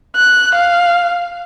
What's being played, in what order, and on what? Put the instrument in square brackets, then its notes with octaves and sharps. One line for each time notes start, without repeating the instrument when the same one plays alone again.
[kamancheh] F#6
F5